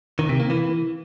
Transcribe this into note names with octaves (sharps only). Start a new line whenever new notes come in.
D#3
C3
A#3
E3